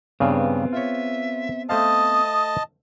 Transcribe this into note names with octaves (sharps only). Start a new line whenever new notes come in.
G2 C#3 B3 C4 G#4
F4 C#5 E5
A3 C5 D#5 F5 A5 D#6